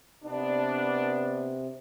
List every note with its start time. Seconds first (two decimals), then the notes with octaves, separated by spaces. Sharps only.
0.23 C3 B3 D4